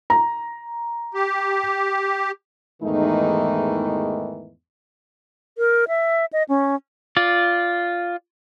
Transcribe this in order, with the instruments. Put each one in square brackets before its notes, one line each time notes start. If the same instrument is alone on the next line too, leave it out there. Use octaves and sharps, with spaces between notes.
[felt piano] A#5
[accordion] G4
[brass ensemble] E2 G#2 D#3 E3 A3 D#4
[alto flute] A#4
E5
D#5
C#4
[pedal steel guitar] F4 D5